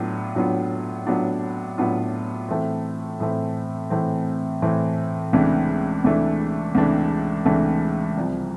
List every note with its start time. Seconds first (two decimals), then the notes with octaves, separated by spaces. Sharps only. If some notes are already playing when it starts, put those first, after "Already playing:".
Already playing: A2 F#3 B3 D4 F4
0.35 A2 F#3 B3 D4 F4
1.06 A2 F#3 B3 D4 F4
1.78 A2 F#3 B3 D4 F4
2.49 A2 E3 A3 C4
3.20 A2 E3 A3 C4
3.90 A2 E3 A3 C4
4.62 A2 E3 A3 C4
5.33 C#2 C3 E3 A3 D4
6.04 C#2 C3 E3 A3 D4
6.75 C#2 C3 E3 A3 D4
7.46 C#2 C3 E3 A3 D4
8.17 C2 C3 F3